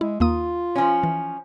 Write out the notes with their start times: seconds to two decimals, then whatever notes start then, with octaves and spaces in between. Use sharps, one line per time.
0.01 G#3 E4
0.20 D#2 A#3 F4 D#6
0.75 F3 C#4
1.03 E3